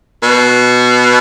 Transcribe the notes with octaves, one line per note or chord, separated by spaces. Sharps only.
B2